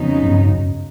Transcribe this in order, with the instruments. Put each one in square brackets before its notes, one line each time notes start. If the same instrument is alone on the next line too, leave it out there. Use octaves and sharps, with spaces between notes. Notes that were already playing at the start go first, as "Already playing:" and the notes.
Already playing: [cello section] F2 C#3 F#3 B3 D#4
[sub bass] G2
F#2